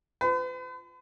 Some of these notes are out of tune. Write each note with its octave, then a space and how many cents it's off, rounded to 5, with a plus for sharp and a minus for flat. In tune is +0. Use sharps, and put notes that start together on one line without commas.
B4 +45